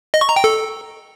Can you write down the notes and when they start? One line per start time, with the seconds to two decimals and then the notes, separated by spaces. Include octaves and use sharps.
0.14 D#5
0.21 C#6
0.29 A#5
0.36 G5
0.44 A4